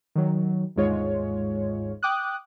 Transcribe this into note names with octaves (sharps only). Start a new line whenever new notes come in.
D#3 F#3
G1 D#2 G#2 G#3 F4 C#5
G5 D6 D#6 F#6